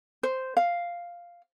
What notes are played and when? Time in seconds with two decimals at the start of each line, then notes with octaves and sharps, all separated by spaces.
0.23 C5
0.57 F5